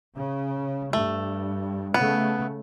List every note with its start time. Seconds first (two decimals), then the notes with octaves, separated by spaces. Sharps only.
0.16 C#3
0.93 G2 A3
1.94 C#3 A3 B3